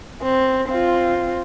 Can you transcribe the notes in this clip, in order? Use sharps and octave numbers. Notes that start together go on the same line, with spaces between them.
C4
C4 F4